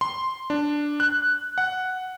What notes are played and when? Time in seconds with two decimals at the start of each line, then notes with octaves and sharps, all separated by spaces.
0.01 C6
0.50 D4
1.00 F#6
1.58 F#5